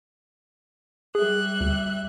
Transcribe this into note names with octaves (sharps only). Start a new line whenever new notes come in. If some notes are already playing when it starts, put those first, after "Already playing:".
G3 G#4 E5 F#6
D2